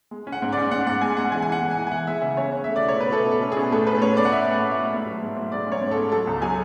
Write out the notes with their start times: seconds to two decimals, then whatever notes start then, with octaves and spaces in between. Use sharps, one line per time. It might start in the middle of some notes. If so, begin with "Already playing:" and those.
0.11 G#3
0.27 C#4
0.32 F#5
0.42 G#2
0.52 C#4 D5
0.71 G#2 F#5
0.86 G#2 F#5
1.01 G#3 G#5
1.17 G#3 F#5
1.32 E3 G#5
1.42 E3 G#5
1.52 F#5
1.61 G#3
1.71 G#5
1.77 E3
1.87 G#5
1.91 E3 F#5
2.07 G#3 E5
2.22 C#3 E5
2.37 G#3 C#5
2.51 C#4
2.64 A3 E5
2.76 D5
2.82 B2
2.89 C#5
2.96 B2 B4
3.11 B2 A4
3.27 B2 A4
3.41 C#4
3.52 B2 G#4
3.72 A2 A4
3.87 C#4 B4
4.01 A2 C#5
4.17 A2 D5
4.25 F#5
4.32 A2 E5
4.47 A2 F#5
4.62 A2
4.71 E5
4.77 A2
4.92 G#2
5.06 F#3
5.22 G#2
5.36 G#2
5.52 G#2 D5
5.67 C#4
5.72 C#5
5.82 G#2
5.91 A4
5.97 G#2
6.12 F#3 A4
6.27 C#2
6.42 F#3 G#5